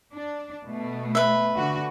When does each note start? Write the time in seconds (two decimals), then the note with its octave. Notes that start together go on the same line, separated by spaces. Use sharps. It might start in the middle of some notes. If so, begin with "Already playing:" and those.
0.13 D4
0.65 B2 A3
1.15 B4 E5
1.55 D3 F#4